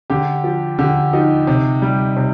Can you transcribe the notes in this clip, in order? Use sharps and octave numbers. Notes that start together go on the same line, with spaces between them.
D3 G4
F3
D3 G4
F3 D#4
C3
G3
C3